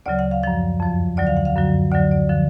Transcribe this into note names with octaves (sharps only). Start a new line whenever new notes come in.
D2 C#3 F#3 D5
F#5
F5
F#2 F3 F5
F2 F3
D2 D3 F#3 D5
F5
F#5
F5
F#2 D3 F#3
D2 D3 F#3 D5
D5
D3 F3